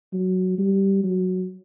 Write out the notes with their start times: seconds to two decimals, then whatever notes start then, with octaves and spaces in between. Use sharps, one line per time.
0.13 F#3
0.58 G3
1.04 F#3